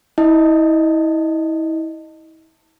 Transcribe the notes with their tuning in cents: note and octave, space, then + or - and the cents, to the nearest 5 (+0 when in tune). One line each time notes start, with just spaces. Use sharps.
E4 -35 D#5 -15